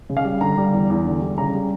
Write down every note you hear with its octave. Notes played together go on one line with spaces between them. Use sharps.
C#3
F5
G3
D3 A#5
G3
E2
E2
D3
G3
C#3 A#5
G3